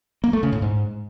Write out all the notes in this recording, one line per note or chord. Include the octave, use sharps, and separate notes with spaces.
A#3
A3
C#3
A2
G#2